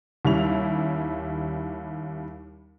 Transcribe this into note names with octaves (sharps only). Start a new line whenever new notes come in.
D#2 G3 C#4 E4 F7